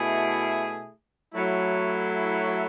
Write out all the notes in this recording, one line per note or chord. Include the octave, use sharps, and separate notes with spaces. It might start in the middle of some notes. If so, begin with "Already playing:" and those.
Already playing: B2 A3 E4 G#4
F#3 A3 E4